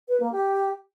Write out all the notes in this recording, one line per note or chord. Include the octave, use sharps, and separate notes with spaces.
B4
A#3
G4